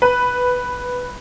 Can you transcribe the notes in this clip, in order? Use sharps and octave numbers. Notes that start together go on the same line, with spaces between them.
B4